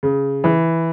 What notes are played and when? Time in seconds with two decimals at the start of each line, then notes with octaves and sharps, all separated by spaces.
0.03 C#3
0.44 E3